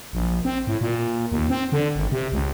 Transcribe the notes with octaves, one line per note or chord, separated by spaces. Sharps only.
A#1
C4
A2
A#2
D#2
C4
D3
G#1
C3
C#2